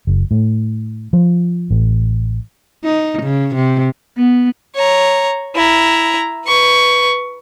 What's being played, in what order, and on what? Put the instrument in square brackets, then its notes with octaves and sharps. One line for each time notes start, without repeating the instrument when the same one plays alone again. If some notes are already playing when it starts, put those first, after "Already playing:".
[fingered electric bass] F#1
A2
F3
A1
[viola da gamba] D#4
C#3
C3
[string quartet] B3
[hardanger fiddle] C#5 A#5
E4 A#5
B4 C#6